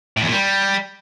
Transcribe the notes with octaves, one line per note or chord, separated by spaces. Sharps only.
A2
E2
A#2
G3